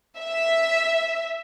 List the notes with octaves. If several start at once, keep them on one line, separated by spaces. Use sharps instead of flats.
E5